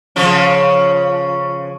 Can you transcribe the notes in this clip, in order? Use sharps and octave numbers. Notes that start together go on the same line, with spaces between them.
C#3 F3 C#4